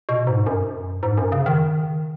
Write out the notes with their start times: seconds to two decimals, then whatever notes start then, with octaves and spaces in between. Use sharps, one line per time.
0.09 B2
0.27 G#2
0.46 F#2
1.03 G#2
1.18 F#2
1.32 C#3
1.46 D#3